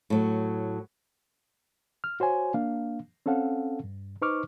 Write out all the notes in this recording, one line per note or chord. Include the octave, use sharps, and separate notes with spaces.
A2 F#3
F6
F#4 C5 C#5 G#5
A#3 D4 F5
C4 C#4 A4 F5 F#5
G2
D#4 B4 C5 C#6 D6 F6